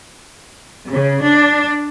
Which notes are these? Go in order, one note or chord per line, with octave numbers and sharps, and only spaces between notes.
C#3
D4